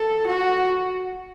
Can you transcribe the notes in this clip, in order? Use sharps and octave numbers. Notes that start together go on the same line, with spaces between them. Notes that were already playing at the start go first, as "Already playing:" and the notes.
Already playing: A4
F#4